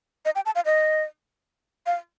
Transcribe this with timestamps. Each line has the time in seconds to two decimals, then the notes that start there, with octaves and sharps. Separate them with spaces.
0.25 D#5
0.35 G5
0.46 A5
0.55 F5
0.66 D#5
1.86 F5